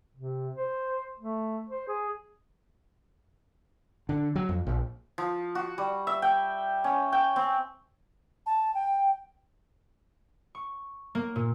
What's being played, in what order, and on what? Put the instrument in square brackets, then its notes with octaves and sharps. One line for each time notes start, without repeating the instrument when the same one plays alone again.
[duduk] C3
C5
A3
C5
G#4
[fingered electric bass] D3
F#3
F2
A#1
[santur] F3
F#4
G3
E5
G5
C#4
G5
C4
[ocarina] A5
G5
[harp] C#6
A#3
A#2